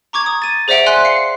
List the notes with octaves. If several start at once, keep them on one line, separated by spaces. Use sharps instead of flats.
A#5 C#6 D6 G#6
D#6
A6 D#7
G#4 C5 D5 E5 F#5 D7
E5 G#5 C6 F#6
F5 C7 C#7